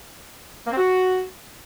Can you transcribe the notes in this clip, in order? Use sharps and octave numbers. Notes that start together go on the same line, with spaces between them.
A#3
C4
F#4